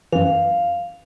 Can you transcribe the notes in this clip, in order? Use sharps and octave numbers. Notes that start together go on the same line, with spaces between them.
F#2 E3 F5